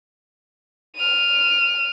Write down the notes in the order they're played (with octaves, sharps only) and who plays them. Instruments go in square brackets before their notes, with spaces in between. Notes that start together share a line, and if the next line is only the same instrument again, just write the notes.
[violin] F6 D#7